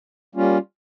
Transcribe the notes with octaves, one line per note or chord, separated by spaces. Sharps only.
G3 A#3 C#4 F4